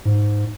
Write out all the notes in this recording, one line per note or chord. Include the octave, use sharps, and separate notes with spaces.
G#2